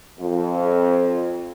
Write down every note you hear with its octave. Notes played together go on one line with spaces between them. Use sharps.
F2